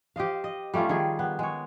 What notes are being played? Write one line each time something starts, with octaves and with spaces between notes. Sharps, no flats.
G4 C5 D#5 F5
D#5
G3 A3 C#4 F4
D#3 G3 G#4
B3
G#3 C#5